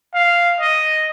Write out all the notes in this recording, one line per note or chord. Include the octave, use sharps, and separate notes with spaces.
F5
D#5